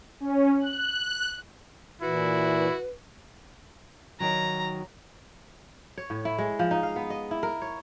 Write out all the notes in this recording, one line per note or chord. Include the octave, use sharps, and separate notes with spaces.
C#4
F#6
A#2 E3 E4 F#4 B4
D#3 F#3 A#5
C#5
A2
E4
G#3
F3
D#4
F5
B3
D#5
E4
A#4
C#5